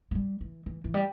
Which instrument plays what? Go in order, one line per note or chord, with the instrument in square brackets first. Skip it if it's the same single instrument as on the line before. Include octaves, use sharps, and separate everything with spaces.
[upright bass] A3
G3
E3
E3
E3
G3